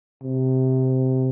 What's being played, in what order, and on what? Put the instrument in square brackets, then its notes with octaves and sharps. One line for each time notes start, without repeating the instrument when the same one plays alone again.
[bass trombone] C3